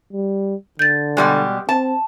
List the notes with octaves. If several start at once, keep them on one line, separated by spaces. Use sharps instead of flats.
G3
D3 G6 A6
B2 G3 G#3
C4 A5